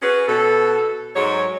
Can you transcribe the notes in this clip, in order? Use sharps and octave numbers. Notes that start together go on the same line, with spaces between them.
C#4 F#4 G#4 B4
B2 A4
G#2 F#3 G#3 C#5